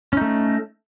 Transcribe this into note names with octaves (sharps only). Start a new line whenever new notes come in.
A3 C#4 D#4